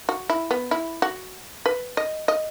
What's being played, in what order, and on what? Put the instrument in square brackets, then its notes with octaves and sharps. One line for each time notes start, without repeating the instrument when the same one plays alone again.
[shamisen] F#4
E4
B3
E4
F#4
B4
D#5
D#5